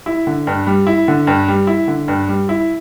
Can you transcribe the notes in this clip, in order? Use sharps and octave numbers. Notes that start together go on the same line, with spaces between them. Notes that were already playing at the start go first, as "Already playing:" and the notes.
E4
D3
G2
G3
E4
D3
G2
G3
E4
D3
G2
G3
E4